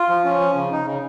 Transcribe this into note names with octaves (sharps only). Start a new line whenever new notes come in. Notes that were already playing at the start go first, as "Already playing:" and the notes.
Already playing: F4
F3
C#4
F3
C#3
D#4
C#3